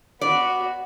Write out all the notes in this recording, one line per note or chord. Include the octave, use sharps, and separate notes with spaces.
B3 F#4 D5